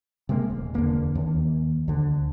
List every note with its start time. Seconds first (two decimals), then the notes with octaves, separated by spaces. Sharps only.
0.29 C3 G#3 A#3
0.50 D#1
0.75 E2 D3 A#3
1.15 D#2
1.88 D2 D3